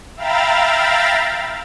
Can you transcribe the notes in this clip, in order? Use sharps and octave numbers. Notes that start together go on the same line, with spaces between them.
E5 F5 G5 A#5 B5 A6